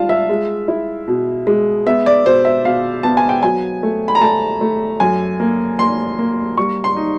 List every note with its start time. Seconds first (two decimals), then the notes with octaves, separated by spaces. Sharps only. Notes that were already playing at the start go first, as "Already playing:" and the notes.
Already playing: G3 F4 F5 A5
0.09 E5
0.30 G#3
0.68 E4
1.08 B2
1.47 G#3
1.86 B3 E5
2.06 D5
2.25 B2 C5
2.45 E5
2.65 B2 F5
3.03 B3 A5
3.17 G#5
3.29 G5
3.43 F#3 G#5
3.83 A3
4.08 B5
4.15 A#5
4.21 A3 A5
4.61 A3
5.00 F#2 G#5
5.40 A#3
5.79 A#3 C6
6.19 A#3
6.57 G3 C#6
6.84 C6
6.96 D#4